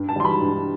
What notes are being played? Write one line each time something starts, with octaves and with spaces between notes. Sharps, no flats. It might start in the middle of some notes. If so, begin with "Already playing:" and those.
Already playing: G2
A5
E3 G3 C6
B5
G2